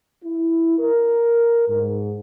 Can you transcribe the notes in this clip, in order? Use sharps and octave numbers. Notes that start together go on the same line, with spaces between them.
E4
A#4
G#2